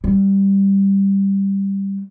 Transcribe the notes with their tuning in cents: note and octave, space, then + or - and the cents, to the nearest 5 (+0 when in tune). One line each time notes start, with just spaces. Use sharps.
G3 +0